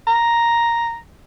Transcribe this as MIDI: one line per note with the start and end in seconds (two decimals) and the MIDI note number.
0.07 0.97 82